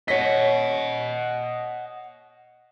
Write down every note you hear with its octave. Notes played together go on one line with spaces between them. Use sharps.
C#5 D#5 F#5 B6